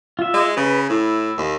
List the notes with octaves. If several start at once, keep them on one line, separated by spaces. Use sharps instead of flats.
F4 E5
G#3
C#3 B4
A2 E4
D#2